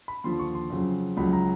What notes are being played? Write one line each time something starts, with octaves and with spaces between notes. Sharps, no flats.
B5
D#2 D3 F3 C6
C#6
C6
F2 C#3 F#3
C#2 C#3 F#3 B5
A#5